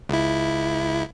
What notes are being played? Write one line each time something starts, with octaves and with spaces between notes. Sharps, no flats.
C#2 E4